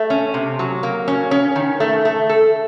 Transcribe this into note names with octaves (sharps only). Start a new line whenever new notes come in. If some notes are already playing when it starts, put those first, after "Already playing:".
Already playing: A3
C#4
C3
F#3
A#3
C#4
C#4
D#3
A3
A3
A4